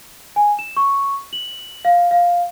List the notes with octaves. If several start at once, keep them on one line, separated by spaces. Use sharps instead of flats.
G#5
E7
C#6
F#7
F5
F5